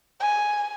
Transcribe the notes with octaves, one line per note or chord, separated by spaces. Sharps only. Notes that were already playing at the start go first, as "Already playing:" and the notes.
G#5